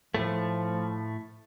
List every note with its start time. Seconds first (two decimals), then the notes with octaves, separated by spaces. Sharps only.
0.14 A2 F3 A3